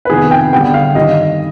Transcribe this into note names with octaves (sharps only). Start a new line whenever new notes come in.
B4
F2 C3 D#3 B3 G#4
G5
D3 G3 B3 G5
F5
G2 D#3 G3 D#5